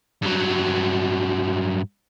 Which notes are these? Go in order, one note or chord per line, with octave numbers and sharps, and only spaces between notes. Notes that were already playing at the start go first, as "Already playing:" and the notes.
G2 F#3